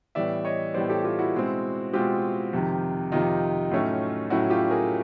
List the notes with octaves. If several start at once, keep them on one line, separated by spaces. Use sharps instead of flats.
A2 E3 G3 B3 D5 E5
C#5 D#5
A2 E3 G3 B3 C5 D5
G4 A4
F4 G4
E4 F#4
B2 G#3 C4
B2 G#3 C4 F4 G4
F2 C3 D#3
F2 C3 D#3 D#4 F4
A2 F#3 A3 C#4
A2 F#3 A3 C#4 E4 F#4
F4 G4
G#4 A#4